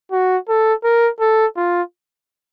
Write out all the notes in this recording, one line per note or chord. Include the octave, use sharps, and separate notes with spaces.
F#4
A4
A#4
A4
F4